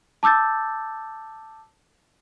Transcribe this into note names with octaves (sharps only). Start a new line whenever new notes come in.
A5 D6 E6 G6 A6